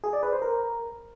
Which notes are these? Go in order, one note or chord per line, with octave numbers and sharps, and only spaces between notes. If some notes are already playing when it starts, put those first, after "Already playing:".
G#4
D5
B4
C5
A#4